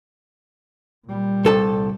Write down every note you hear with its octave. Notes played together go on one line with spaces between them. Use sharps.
A#2 G3
C2 A4 A5